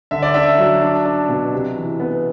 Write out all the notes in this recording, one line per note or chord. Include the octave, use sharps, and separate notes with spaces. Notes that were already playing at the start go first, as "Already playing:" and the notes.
D3 E5
D5
D4 E5
F#3
D4
D4
B2
C3
E3
B3